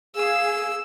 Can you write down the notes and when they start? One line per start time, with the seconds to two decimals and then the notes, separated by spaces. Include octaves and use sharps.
0.15 G#4 F5 E6